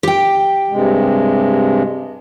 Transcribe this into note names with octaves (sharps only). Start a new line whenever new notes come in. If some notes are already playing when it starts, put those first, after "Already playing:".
G4 G5
G2 C3 G#3